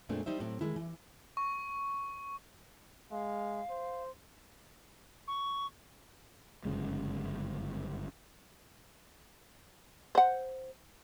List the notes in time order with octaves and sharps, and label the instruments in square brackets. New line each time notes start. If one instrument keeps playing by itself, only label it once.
[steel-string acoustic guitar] F2 A#2 G#3 A3 C4 D4
G3 D#4 C5 E5
A2 F#3 C4
D#3 G#3 E4
E3
[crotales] C#6
[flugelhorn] G#3 [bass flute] F5
[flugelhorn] C5
[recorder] C#6
[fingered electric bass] G1 F#2 C#3 G#3
[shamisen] C5 F#5